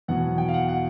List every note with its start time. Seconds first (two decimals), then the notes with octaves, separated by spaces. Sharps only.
0.08 E2 B2 F#3 B3 F#5
0.38 G5
0.48 F5
0.54 F#5
0.69 F#5